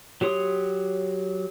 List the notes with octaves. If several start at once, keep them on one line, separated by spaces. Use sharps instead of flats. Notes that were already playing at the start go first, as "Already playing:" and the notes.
F#3 G4 C#5 C6 D#6